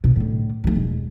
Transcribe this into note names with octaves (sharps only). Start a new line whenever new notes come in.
B2
A2 D3
D2 F3
E1